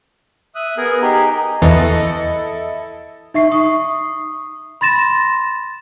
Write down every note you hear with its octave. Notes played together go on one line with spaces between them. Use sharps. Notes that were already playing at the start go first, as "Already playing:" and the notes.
E5 D#6 F#6
B3 G#4 A#4
D#4 G4 G#4
E2 E3 E4 A4 D#5
D#4 E5 C#6 C7
C#6 D#6
B5 C6 A6 A#6 E7